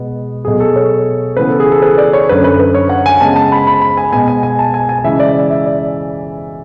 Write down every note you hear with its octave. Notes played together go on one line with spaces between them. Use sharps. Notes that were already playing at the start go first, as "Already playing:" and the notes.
Already playing: B2 G#3 B3
B2 F#3 A3 G#4
A4
C#5
C#3 E3 B3 B4
A4
G#4
A4
B4
D5
C#5
F#2 D3 A3 B4
B4
B4
C#5
F#5
G#5
C#3 G#3 B3 A5
A5
B5
B5
B5
G#5
B2 G#3 B3 G#5
G#5
G#5
A5
G#5
G#5
C#3 E3 G#3 E5
D5
E5
E5
D5